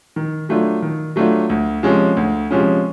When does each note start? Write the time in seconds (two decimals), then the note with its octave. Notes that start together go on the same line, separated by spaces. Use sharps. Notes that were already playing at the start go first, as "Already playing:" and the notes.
0.16 D#3
0.49 F#3 A3 D4 F4
0.82 D#3
1.16 F#3 A3 D4 F4
1.50 D2
1.83 C3 F3 G#3 C#4
2.17 D2
2.51 C3 F3 G#3 C#4